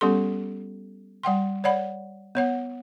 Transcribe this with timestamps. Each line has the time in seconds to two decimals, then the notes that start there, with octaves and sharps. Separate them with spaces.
0.01 G3 B3 C#4 G4 A4 C6
1.23 G3 F#5 G5 C6
1.64 C#5 D5 F#5 B5
2.35 B3 C#5 F#5